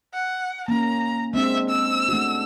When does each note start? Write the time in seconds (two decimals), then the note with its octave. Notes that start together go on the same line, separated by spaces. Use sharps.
0.13 F#5
0.68 A#3 C#4 A#5
1.34 G#3 C4 D4 E5
1.69 E6
2.09 A3 D4 F#4